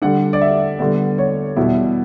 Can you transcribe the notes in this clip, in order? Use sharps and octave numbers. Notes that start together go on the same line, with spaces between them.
D3 G3 D4 F#5
D5
E5
D3 G3 B3 D5
C#5
E2 B2 G3 E4